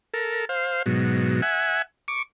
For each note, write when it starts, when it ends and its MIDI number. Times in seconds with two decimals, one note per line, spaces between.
0.14 0.45 69
0.14 0.45 70
0.49 0.83 72
0.49 0.83 77
0.86 1.41 44
0.86 1.41 47
0.86 1.41 54
1.42 1.82 76
1.42 1.82 78
1.42 1.82 80
2.08 2.22 85
2.08 2.22 86